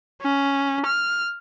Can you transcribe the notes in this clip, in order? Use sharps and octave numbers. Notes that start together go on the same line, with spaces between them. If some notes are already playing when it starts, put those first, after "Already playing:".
C#4
F6